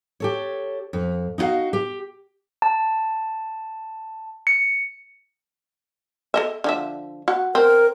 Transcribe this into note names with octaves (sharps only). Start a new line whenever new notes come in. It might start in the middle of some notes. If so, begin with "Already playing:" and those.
G4 A4 C#5
F2
D#4 E4 F#4 F5
G4
A5
C#7
A4 D#5 E5
D3 F3 E5
F#4 F#5
C4 A#4